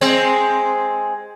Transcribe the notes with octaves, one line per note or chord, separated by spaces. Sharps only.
G#3 C4